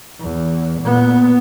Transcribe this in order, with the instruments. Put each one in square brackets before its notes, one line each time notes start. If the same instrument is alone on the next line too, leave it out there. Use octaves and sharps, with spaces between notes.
[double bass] E2
A#2 B3